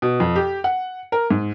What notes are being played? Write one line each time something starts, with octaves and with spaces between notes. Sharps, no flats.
B2
F2
G4
F#5
A#4
G#2